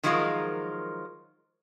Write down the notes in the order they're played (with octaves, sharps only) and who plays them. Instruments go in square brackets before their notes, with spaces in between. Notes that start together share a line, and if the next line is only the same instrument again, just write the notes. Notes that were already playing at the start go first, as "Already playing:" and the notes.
[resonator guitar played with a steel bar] D#3 F3 F#3 G#3 F4 A#4